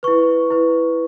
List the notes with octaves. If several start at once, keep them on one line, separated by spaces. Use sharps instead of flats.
E4 B4 C#6
E4 B4